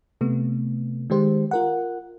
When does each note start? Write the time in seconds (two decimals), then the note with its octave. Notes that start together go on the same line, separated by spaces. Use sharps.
0.21 C3 A3 B3
1.10 D#3 G#3 G4 C5
1.51 F4 A#4 F#5